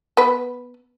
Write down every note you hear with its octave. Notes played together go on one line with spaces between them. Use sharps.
B3 B4